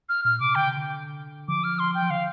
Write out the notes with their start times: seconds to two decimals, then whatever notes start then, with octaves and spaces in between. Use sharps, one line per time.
0.09 F6
0.25 A#2 F6
0.40 C3 D6
0.55 D3 G5
0.66 C3
0.76 D3
1.48 F3 D6
1.64 F6
1.79 C6
1.95 G5
2.02 F3
2.10 D3 F5